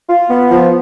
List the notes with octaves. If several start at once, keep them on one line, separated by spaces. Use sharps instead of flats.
F4
B3
F3